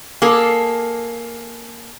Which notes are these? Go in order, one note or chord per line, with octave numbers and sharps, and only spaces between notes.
A#3 G#4 A4